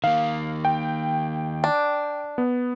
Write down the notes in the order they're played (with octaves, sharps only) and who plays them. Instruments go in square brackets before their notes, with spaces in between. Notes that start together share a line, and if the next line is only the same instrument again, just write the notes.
[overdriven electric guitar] D#3 A#3 [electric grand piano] F5
[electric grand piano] G5
[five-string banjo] D4
[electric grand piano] B3